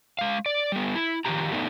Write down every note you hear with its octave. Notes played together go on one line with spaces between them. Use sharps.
G#3 F5
D5
G3 B3
E4
D#3 F3 G4 A#5
A3 B3 D4 D#4